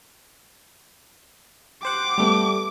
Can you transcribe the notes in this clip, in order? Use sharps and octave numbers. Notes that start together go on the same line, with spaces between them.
G4 C5 F#5 D6
G3 A3 B3